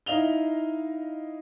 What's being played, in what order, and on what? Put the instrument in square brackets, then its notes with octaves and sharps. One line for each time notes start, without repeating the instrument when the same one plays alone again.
[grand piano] D#4 E4 D#5 F5 F7 G7